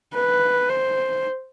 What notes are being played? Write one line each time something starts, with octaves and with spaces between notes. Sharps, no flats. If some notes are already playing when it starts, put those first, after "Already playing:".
B4
C5